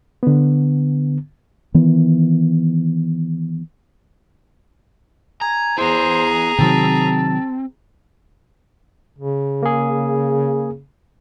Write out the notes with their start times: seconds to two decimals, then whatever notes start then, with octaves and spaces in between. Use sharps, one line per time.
0.23 D3 B3
1.74 D#3 E3 B3
5.41 G#5 A#5
5.78 B3 E4 G#4 C5 A#5
6.59 C3 D#3 F#3 C4 A5
9.18 C#3
9.63 A#3 G#4